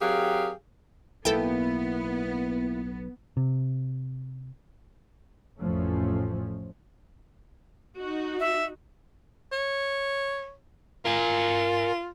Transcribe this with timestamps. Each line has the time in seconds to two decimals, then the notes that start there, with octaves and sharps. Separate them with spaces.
0.01 F#3 C4 G4 G#4 A#4 F5
1.25 B1 A2 A#3 B3 E4 A4 G5
3.37 C3
5.60 A1 F2 A2 F3 A3 C#4
7.98 D#4 F#4
8.40 E5
9.52 C#5
11.05 F4 A#4 G#5